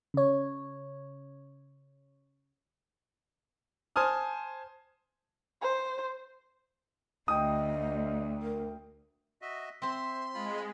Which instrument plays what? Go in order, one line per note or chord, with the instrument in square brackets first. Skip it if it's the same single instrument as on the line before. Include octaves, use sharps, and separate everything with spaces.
[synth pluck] C#3 C#5
[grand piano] C5 G#5 A5 D#6 F6
[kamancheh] C5
[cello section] D2 [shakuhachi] D#5 [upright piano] G5 D#6
[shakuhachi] A#4
[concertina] F#4 D#5 E5
[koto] C4 C5 [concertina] E5 [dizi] C6
[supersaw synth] G#3 [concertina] F4 B5